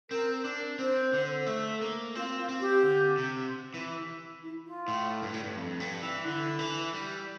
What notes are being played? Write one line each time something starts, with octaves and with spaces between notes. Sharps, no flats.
C4 A#4
D4
C4 C5
D3
A3
A#3
C4 F4
F4
C4
G4
D3
C3
E3
E4
F4
A2
G2
A2
G2
F2
G2
E3
D3 E4
E3
G3